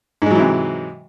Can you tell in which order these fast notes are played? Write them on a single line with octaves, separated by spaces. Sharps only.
G#2 G#3 F#3 E3 C3